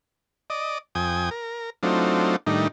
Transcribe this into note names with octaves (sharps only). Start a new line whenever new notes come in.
D5 D#5
F2 G5 G#5 D#6
A#4
F#3 A3 C4 D4 D#4 F4
A2 D#3 G3 D4 D#4